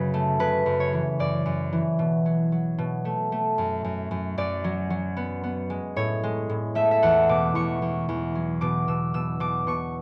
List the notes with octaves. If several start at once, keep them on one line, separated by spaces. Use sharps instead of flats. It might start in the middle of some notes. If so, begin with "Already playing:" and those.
Already playing: F#2 C#3 F#3 B4
A3
C#3 B4
F#2
C#5
E3
F#2 D5
F#2
E3
B2
F#3
F#3
B2
A3
A3
F#2
F#2
F#2
F#2 D5
F#3
F#3
B3
B3
G#3
A2 C#5
G#3
A2
A3 E5
E5
E2 F#5
B2 D6
E2 C#6
E2
E2
F#3
B2 D6
B2 E6
B2 E6
B2 D6
B2 C#6